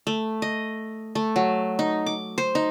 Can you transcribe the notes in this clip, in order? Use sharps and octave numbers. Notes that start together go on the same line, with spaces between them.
A3
D#5
A3
F#3
D#4
D6
C5
D#4